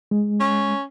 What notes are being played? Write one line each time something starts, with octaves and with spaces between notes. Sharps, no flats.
G#3
C#4